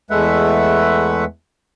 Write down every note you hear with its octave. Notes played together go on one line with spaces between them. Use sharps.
E2 G#3 A3 B4 E5 F#5